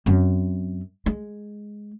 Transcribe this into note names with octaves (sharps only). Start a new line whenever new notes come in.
F#2 C4
G#3